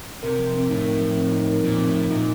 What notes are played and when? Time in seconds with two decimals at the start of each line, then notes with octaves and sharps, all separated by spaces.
0.23 C3 A#4
0.39 F3
0.54 C4
0.70 A2 D#4
0.85 A#4
1.01 F3
1.17 C4
1.32 D#4
1.48 A#4
1.64 A#2 F3
1.79 C4
1.87 A2
1.95 D#4
2.11 A#2 D#4